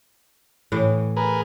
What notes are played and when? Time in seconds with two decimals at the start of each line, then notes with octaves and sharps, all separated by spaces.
0.72 A2 E3
1.17 G#4 A#4 B4